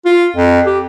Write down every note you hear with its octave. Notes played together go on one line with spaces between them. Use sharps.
F4
F2
G4